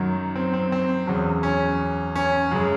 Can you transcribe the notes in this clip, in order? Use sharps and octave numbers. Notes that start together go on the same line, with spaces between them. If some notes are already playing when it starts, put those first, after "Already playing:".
Already playing: F#2 D#3 F#3
C4
C4
C4
E2 C#3 F#3
C#4
C#4
F#2 C#3 G#3